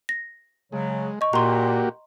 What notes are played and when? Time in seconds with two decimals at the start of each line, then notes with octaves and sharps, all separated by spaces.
0.09 A#6
0.72 C#3 F#3 G#3
1.21 D#5 C#6
1.33 A#2 A#3 F#4 G4 A#5 C6